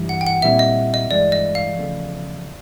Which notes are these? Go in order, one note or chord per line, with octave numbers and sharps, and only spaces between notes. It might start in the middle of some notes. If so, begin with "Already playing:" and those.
Already playing: G2 E3 G3
F#5
G5
F#5
A#2 G3 C4 E4 E5
D#5
D#5
G2 E3 G#3 D5
D#5
F5
E2 C#3 F3 A3